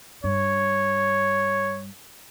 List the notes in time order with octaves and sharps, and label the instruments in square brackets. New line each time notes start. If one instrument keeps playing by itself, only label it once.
[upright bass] G2 [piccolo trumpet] C#5